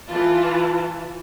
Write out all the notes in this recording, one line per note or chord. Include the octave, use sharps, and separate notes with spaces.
E3 F4 A5